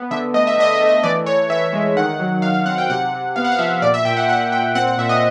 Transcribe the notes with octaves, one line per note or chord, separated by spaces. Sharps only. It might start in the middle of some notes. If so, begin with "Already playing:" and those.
Already playing: B3
D3 E5
A3 D#5
E5
D3 D#5
E5
A3
D#5
E3 D5
E3 C#5
E3 E5
G#3
D#3 F#5
F#3
D#3 F5
F5
C4 F#5
G5
C3 F#5
C3
B3 F5
F#5
F5
F3 E5
A#2 D5
E5
A#2 G5
F#5
A#2 F#5
A#2 G5
C4 F#5
F#5
A#2 E5
D#5